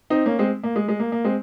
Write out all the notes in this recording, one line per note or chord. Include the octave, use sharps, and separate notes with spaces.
C4 D#4
A#3 C#4
G#3 C4
A#3
G#3
G#3
A#3
A#3
G#3 C4